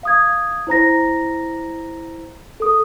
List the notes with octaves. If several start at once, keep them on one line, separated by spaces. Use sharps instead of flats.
F5 D#6 G#6
E4 C5 A#5 A#6
A4 D#6